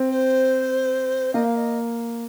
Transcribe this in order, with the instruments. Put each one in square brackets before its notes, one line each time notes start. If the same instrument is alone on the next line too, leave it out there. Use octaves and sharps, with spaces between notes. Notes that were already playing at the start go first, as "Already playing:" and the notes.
Already playing: [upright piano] C4
[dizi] C5
[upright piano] A#3 [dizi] D#5
[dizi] F5
D#5